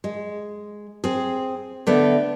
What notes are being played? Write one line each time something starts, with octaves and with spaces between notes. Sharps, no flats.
G#3
C4 G#4
D3 A3 B3